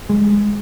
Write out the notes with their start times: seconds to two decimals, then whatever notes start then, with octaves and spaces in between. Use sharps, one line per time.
0.10 G#3